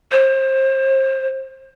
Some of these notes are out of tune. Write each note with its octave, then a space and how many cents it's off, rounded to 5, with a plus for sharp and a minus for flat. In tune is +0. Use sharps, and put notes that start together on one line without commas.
C5 +30